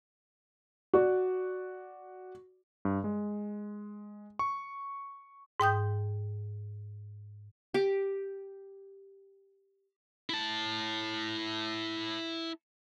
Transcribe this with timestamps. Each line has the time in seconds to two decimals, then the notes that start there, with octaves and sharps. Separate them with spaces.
0.94 F#4 D5
2.85 G2
3.04 G#3
4.39 C#6
5.60 G#2 G5 D#6 G6
7.74 G4 D6
10.30 E4 A5